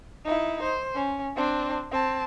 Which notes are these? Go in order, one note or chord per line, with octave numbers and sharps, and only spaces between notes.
D#4 E4
C5
C#4
C4 D4
C4 A5